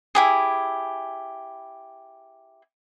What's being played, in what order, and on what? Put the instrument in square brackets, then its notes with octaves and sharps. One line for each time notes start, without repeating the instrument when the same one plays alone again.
[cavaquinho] E4 G4 G#4